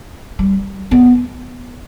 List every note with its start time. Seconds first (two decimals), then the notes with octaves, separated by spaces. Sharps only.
0.39 G3
0.91 B3